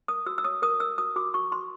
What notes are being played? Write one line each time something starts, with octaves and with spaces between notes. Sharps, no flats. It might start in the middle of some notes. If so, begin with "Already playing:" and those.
A#4 D#6
F#4 E6
E6
C#5 D#6
A#4 D#6
A#4 E6
F#4 D#6
F#4 D6
F#4 C#6
F#4 C6